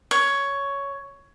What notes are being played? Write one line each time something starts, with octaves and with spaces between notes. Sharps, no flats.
C#5